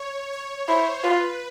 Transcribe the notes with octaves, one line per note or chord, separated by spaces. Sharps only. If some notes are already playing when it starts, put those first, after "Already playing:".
Already playing: C#5
C#5
E4 C5
F4 B4